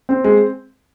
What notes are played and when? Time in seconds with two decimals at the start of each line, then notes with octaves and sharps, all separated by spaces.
0.09 C4
0.24 G#3